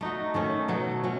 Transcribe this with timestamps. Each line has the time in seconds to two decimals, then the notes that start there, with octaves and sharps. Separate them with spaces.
0.01 A3 D#4 F#4
0.34 D#3 A3 C#4
0.68 B2 F#3 A3
1.03 F#3 C#4